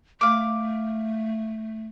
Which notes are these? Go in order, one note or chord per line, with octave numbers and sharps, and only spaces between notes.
A3 F5 D6